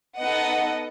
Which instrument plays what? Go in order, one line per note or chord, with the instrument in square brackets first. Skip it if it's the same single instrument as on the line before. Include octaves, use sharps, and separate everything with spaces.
[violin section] B3 D#4 A4 D#5 F#5